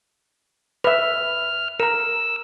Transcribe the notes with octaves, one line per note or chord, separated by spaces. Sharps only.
B4 E5 F6
A#4 A#5 E6